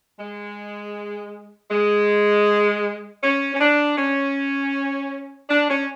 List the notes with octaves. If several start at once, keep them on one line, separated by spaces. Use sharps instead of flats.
G#3
G#3
C#4
C#4
D4
C#4
D4
C#4